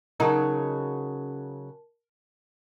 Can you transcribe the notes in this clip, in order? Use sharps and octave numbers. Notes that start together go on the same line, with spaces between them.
C#3 F#3 D#4 A#4 A5